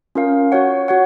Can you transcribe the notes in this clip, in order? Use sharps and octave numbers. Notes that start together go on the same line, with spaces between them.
C#4 F4 A#4 F5
F#4 C#5 F#5
F#4 C#5 F#5